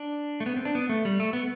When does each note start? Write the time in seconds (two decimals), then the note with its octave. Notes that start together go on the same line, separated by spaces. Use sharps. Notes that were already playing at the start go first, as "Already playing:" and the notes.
Already playing: D4
0.40 A3
0.46 B3
0.56 C4
0.65 D4
0.75 B3
0.89 A3
1.05 G3
1.20 A3
1.33 B3